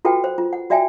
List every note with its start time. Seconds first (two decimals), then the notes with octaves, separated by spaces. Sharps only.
0.05 F4 F#4 A4 B4 F#5 G5
0.24 C5
0.38 F4
0.53 F#5
0.70 F#4 D5 E5 G5 G#5